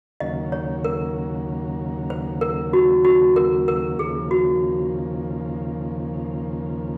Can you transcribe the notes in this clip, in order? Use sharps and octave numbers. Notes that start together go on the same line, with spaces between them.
D#2 C#3 F#3 A#3 D#5
C#5
A#4
C5
A#4
F#4
F#4
A#4
A#4
D#2 C#3 F3 A#3 G#4
F#4